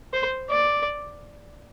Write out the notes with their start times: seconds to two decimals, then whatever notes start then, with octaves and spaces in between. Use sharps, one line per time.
0.13 C5
0.50 D5